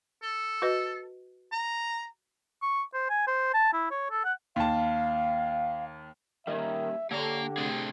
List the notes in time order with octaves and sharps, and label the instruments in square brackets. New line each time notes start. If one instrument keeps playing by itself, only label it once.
[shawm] A4
[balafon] F#4 B4 D#5
[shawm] A#5
[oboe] C#6
C5
G#5
C5
A5
E4
C#5
A4
F#5
[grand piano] D#2 A5 [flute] F5
[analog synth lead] D#3 [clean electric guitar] G3 A#3 C#4 [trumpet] E5
[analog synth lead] D3 [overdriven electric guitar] A#3 A#5 [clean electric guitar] D4 C#5 [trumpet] G4
[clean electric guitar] C3 A3 D4 [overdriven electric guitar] C4 G#4